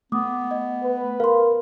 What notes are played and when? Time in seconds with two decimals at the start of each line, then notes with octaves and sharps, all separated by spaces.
0.12 A3 B3 D6 D#6
0.51 D#5
0.83 B4
1.20 A#4 F5 B5 C6